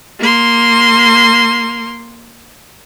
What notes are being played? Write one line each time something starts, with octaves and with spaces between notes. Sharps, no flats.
A#3 C6